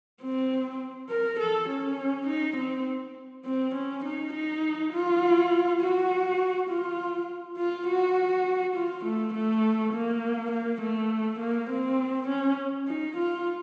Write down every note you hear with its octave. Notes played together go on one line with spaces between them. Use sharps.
C4
A#4
A4
C#4
D#4
C4
C4
C#4
D#4
D#4
F4
F#4
F4
F4
F#4
F4
A3
A3
A#3
A#3
A3
A#3
C4
C#4
D#4
F4